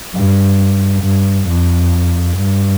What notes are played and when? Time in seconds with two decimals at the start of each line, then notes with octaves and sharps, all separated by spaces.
0.14 G2
1.03 G2
1.48 F2
2.37 G2